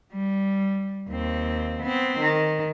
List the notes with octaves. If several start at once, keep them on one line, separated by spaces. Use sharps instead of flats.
G3
D#2 C4
B3 C4
D#3